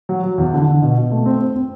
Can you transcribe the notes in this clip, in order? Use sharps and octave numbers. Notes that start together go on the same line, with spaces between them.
F#3
F#3
E2
D3
D3
B2
B2
A3
C4
C4
C4